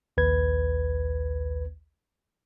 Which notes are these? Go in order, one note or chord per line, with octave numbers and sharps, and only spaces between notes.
A#1 D#2 B4 G#6